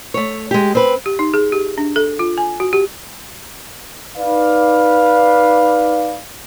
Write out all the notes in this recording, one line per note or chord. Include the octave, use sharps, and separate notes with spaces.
A3 C#5
G#3 G4
C4 B4
G4
D#4
G#4
G4
D4
A4
F4
G#5
F#4
G4
D#4 B4 D5 F5